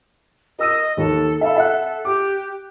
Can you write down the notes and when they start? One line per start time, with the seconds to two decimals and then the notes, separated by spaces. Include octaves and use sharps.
0.59 A#4 D#5 E6 D#7
0.97 D#2 A4
1.41 A4 E5 F5 B5
1.57 E5 F#5 F#6
2.05 G4 D6